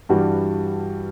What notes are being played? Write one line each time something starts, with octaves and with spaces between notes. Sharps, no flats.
G2 E3 G3 D4 F#4